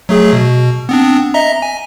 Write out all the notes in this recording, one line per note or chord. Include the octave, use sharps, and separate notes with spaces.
F#3 A3 G#4
B2
B3 C4 D4
D#5 E5 A#5
G#5